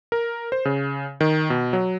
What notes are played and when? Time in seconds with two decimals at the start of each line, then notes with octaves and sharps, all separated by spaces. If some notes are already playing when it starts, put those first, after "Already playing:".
0.12 A#4
0.52 C5
0.65 C#3
1.21 D#3
1.50 B2
1.73 F#3